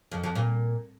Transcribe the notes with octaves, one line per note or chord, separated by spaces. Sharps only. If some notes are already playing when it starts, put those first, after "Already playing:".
F2
F2
A#2